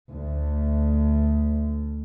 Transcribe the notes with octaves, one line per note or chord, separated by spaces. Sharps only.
D2 A3